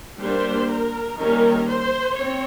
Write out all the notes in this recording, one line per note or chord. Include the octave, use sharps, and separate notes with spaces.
G3 A#3 D4 C5
A#4
D#3 G3 A#3 C#4 A#4
C5
C4 C#5